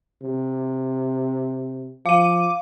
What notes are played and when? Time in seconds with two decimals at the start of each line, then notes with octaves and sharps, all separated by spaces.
0.22 C3
2.06 F3 F5 D6 D#7